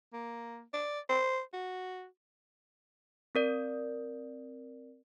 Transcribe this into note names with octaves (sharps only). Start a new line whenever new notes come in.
A#3
D5
C5
F#4
C4 A#4 D5